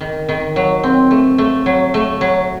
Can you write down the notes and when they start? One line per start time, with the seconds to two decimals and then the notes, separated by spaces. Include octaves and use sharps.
0.01 D#3
0.29 D#3
0.56 F#3
0.83 C4
1.11 A3
1.38 A3
1.66 F#3
1.94 A3
2.21 F#3